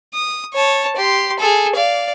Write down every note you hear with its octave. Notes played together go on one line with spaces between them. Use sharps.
D#6
C#5 A5
G4 C6
G#4 A4
D5 F5